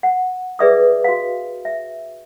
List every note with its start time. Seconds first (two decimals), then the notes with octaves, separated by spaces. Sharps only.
0.03 F#5
0.59 G#4 B4 D5 E5 D6 D#6
1.04 F#4 F5
1.65 E5